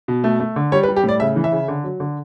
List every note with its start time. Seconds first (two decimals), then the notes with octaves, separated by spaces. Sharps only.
0.08 B2
0.24 A3
0.40 A3
0.56 D3
0.72 G3 C#5
0.83 B4
0.88 G3
0.96 G4
1.04 A2 D5
1.20 C#3 E5
1.36 E3
1.44 E5
1.52 C#3
1.68 D3
1.84 F#3
2.00 D3